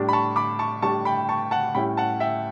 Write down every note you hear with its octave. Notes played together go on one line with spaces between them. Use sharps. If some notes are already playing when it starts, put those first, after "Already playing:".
Already playing: A2 G3 D4
B5
A5 C#6
B5 D6
A5 C#6
A2 G3 D4 A5 C#6
G5 B5
A5 C#6
F#5 A5
A2 G3 C#4 E4 G5 B5
F#5 A5
E5 G5